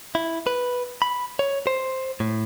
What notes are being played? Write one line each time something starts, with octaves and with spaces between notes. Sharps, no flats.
E4
B4
B5
C#5
C5
A2